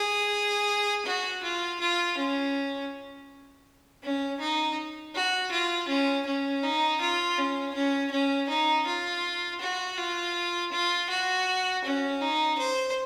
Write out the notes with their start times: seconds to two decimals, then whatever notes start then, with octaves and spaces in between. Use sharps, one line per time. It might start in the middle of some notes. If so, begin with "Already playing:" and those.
Already playing: G#4
1.05 F#4
1.43 F4
1.80 F4
2.17 C#4
4.03 C#4
4.40 D#4
5.15 F#4
5.51 F4
5.88 C#4
6.26 C#4
6.63 D#4
7.01 F4
7.38 C#4
7.74 C#4
8.11 C#4
8.49 D#4
8.86 F4
9.61 F#4
9.98 F4
10.72 F4
11.10 F#4
11.84 C#4
12.21 D#4
12.58 C5